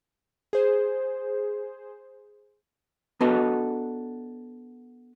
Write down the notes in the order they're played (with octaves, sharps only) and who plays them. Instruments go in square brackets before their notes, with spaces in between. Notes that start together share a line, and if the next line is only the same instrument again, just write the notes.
[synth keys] G#4 C5
[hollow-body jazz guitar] B3 D4 F#4 A4 B4 D#5